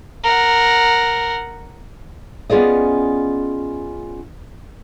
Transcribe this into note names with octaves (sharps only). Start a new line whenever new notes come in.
A#4 F#5
B3 C#4 F4 G#4 D5 D#5